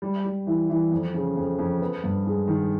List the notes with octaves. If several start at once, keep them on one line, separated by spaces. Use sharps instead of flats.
G3
G3
E3
E3
F2
C#3
F2
F2
B3
G2
G#3
D#3